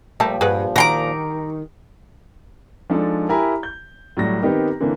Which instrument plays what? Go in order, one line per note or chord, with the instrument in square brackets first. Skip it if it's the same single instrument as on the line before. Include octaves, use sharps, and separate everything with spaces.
[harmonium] A#2 F3 [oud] G3 [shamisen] A3 A#4 A5
[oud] G2 [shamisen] G#4 B4 F#5
[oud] D#3 [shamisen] F#4 [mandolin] A#5 C6 D6
[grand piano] F3 G#3 D4 D#4 A4
E4 G4 A#4 G#5 A#5 B5
G6
A2 F#3 G3 A#6
D#3 B3 C4 D#4 G4 A#4
D3 E3 A#3 C4